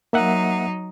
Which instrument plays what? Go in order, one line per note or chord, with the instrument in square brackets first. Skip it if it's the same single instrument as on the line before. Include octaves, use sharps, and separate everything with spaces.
[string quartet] F#3 D#4 [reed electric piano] A#3 E5 F#5